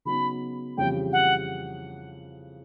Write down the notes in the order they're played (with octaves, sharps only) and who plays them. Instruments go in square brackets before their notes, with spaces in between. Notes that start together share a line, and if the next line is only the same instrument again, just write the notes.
[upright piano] C#3 F#3 B3 D#4 [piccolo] B5
[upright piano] F2 C#3 E3 G3 [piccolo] G5
[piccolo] F#5